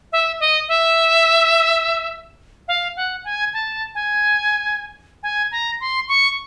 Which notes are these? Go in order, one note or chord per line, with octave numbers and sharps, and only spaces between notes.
E5
D#5
E5
F5
F#5
G#5
A5
G#5
G#5
A#5
C6
C#6